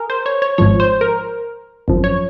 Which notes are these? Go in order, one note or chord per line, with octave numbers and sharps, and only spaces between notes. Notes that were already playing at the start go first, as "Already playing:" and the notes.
Already playing: G#4 A#4
C5
C#5
C#5
G#1 G#2 F3 C#5
C5
A#4
G#1 F#2 F3
C#5